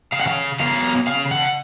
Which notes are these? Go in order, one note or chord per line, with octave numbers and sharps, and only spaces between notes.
C#3 F5
F#5
F5
F#3 B3 F5
C#3 F5
F#5